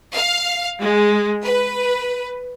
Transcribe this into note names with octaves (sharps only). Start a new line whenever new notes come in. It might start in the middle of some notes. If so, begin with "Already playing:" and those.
F5
G#3
B4